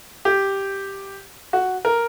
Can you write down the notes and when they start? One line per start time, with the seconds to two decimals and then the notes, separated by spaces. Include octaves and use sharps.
0.25 G4
1.53 F#4
1.85 A#4